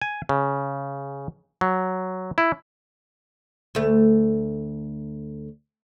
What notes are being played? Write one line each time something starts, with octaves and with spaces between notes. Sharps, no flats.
G#5
C#3
F#3
E4
D2 A3